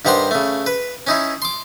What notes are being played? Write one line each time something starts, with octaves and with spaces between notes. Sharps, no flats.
G2 D#3 G4 C5 F#5 C6
C#3 A3
B4
C#4 D#4 E4
C6 D6